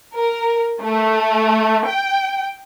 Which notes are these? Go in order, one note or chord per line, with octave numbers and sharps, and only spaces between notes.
A#4
A3
G5